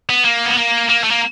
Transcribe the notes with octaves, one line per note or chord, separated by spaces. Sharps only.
B3
A#3
B3
A#3
A#3
A3
A#3